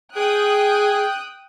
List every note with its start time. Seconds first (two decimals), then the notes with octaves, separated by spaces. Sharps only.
0.16 G#4 G5 D#6 F#6